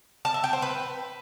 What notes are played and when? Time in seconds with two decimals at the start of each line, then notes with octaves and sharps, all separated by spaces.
0.25 A5
0.34 E5
0.44 G5
0.53 C5
0.62 B4